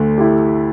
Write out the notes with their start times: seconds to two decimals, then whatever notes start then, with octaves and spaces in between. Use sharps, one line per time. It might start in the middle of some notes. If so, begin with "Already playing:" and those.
Already playing: D2 D3 A3
0.18 E4 G4